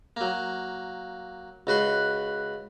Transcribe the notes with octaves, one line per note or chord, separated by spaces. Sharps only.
F#3 A#3
C#2 F#4 B4 C6